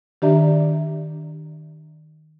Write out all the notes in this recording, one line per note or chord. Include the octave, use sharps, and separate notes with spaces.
D#3 D4 G4 D5 E5 A#5